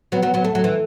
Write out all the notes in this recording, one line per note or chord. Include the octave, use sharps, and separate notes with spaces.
F#3 B3
F#3 B3
F#3 B3
A3
F#3
E3